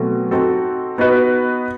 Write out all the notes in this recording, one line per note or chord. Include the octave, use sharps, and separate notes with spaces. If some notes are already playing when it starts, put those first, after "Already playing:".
Already playing: B2 F#3 A3 C4
C4 D#4 F#4 A4
B3 D#4 F#4 B4 D#5